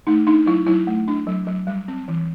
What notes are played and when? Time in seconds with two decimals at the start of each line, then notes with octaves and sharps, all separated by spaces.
0.07 A3 D#4
0.27 D4 D#4
0.46 F#3 E4
0.67 F#3 E4
0.87 A3
1.08 D4
1.27 F#3
1.47 F#3
1.67 G3
1.88 C4
2.08 E3